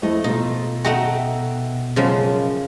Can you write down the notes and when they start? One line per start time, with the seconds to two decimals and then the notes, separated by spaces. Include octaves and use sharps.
0.02 F2 A3 E4 D#5
0.24 B2 A3 D#4 F4
0.84 A3 D#4 F#4 E5 F#5 G5
1.96 F#2 C#3 F3 G#3